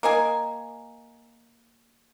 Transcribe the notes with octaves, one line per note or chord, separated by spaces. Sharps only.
A#3 D#5 G#5